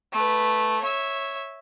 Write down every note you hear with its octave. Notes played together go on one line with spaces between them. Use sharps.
A3 B4
C#5 E5